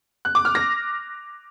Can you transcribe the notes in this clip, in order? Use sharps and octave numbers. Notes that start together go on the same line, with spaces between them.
F#6
D6
F6
A#6